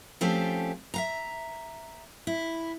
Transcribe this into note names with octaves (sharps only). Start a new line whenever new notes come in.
F3 A3 C4 C#4 G4 A4
E5 F5 A#5
E4